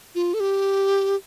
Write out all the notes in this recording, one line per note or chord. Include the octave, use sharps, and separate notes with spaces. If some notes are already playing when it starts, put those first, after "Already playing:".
F4
A4
G4